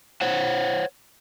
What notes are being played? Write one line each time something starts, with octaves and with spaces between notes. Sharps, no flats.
C5 C#5 F#5